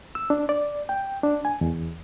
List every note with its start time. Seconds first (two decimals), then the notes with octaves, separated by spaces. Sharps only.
0.15 E6
0.30 D4
0.49 D5
0.89 G5
1.23 D4
1.45 G#5
1.61 E2